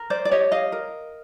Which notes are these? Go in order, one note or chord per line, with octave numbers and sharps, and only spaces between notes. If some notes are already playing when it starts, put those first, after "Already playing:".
Already playing: A#4
C5 D5
D5
G4 C#5 D#5
D#5 F5
A#4